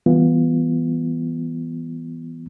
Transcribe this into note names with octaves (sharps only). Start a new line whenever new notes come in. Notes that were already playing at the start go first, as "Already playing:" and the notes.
E3 G3 B3 F4